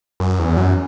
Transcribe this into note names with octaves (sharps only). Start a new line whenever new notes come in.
F#2
E2
F#2